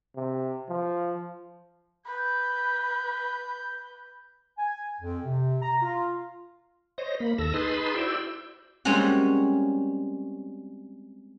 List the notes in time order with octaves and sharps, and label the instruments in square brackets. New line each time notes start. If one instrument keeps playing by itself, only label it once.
[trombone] C3
F3
[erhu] B4 [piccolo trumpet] G6
[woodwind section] G#5
F2
C3
A#5
F4
[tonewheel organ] C5 C#5 D#5 A#6
A#3 B5
D#2 A4 E6 A#6
D#4 G#4 B4 A5 B5 C6
E4 F#4 C5 D5 G5 E6
[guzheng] G3 G#3 A#3 C4 C#4 F#4